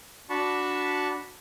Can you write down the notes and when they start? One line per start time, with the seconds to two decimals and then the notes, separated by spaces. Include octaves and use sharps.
0.30 D4 F#4 A5 B5 C#6